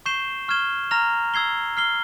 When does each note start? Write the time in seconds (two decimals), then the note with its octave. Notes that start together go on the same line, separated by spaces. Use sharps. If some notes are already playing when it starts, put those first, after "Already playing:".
0.06 C#6 G6 C7 E7 G7
0.48 C#6 F6 G#6 E7 G7
0.91 A#5 F6 A#6 F7
1.34 E6 G#6 C7 G7
1.77 F6 C7 G7